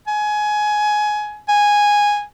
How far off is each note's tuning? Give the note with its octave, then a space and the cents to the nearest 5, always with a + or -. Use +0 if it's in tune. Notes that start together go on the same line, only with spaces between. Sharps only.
G#5 +20
G#5 -10